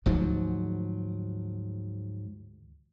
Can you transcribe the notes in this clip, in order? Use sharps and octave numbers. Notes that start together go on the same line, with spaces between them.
D2 G#2 F3 F#3